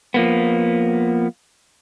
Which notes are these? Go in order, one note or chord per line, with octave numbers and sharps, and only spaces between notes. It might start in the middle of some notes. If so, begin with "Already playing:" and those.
F3 A#3 B3